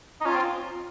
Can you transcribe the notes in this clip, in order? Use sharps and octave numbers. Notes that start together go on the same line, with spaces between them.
D#4
C#4 F4
C4